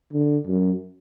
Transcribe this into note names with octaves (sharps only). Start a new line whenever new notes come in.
D3
F#2